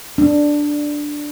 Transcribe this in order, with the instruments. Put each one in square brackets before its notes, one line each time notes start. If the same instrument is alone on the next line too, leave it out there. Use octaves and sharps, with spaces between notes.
[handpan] D4